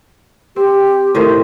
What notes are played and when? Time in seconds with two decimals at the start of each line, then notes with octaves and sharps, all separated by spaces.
0.56 C4 G4
1.15 A2 D#3 C5